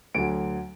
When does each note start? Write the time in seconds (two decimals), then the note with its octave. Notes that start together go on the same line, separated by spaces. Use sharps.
0.14 D2 D3 F#3 D7